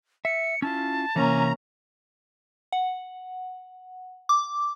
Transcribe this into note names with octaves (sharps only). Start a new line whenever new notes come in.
E5 C#7
C#4 E4 F4 A5
C3 E3 A#3 C#4 A#5
F#5
D6